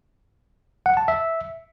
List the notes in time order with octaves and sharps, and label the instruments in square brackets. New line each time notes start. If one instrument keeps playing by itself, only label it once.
[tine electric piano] F#5
A5
E5